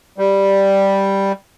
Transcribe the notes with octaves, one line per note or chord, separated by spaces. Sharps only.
G3